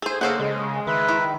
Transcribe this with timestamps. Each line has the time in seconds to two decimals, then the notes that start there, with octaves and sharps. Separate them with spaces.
0.02 G#4 A4 C5
0.21 C#3 A#3 A4 C5 F#5
0.40 C#3 G#3
0.87 D#3 B4 E5
1.08 E4